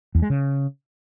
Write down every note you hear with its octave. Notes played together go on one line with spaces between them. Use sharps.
E2
G#3
C#3